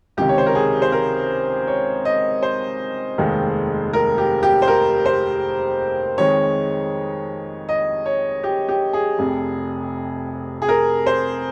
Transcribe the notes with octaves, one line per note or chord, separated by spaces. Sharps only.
C#2 C3 D#3 G4
C#5
C5
A#4
G#4
C5
A#4
C#5
D#5
C5
F1 D#2 D#3 G#3
A#4
G4
G4
C5
A#4
C5
F2 D#3 G#3 C#5
D#5
C#5
G4
G4
G#4
F1 F2 C3
G#4
A#4
C5